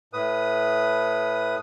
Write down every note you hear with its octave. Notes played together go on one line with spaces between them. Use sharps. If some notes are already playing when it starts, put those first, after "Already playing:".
A2 B4 D#6